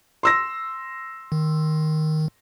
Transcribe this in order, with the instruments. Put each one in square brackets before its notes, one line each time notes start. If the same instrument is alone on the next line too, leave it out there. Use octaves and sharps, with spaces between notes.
[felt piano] C6 E6 A#6
[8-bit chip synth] D#3